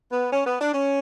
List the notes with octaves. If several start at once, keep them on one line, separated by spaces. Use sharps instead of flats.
B3
C#4
B3
D4
C#4